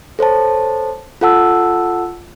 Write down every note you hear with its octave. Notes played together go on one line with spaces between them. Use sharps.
A4 C5 C#5 A5
F4 A4 F#5 A5 E6